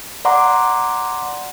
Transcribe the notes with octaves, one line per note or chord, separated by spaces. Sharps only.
D5 F#5 A#5 C6 D6